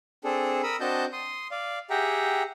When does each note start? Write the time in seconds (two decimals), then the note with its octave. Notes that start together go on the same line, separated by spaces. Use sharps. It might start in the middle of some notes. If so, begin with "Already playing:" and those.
0.24 C4 D4 G#4 A4
0.63 A#4 B5 D#6 E6
0.80 C4 D4 F#4 D#5 A5 G6
1.13 C6 D#6
1.51 D5 F5
1.90 G4 G#4 E5 F#5 G5 A#5